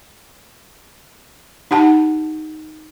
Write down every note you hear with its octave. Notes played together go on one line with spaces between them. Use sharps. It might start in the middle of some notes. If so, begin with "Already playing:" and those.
D#4 G4 F#5 A5